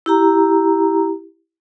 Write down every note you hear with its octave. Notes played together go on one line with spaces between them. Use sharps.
E4 G4 A#5